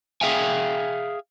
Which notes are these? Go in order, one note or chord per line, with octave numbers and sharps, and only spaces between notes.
G#4 E5 F5 G5 G#5